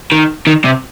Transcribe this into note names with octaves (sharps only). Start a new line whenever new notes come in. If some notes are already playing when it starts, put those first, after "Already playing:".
D#3
D#3
C3